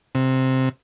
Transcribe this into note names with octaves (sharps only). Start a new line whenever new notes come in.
C3